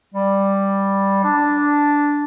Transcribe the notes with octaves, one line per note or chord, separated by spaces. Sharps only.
G3
D4